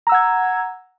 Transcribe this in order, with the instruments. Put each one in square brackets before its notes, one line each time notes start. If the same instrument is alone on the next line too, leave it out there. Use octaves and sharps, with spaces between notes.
[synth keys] A#5
E6
F#5
G#6